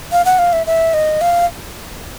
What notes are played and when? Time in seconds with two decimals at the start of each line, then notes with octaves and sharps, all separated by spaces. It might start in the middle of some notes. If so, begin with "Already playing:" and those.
0.12 F5
0.25 F#5
0.39 F5
0.53 E5
0.67 E5
0.94 D#5
1.21 F5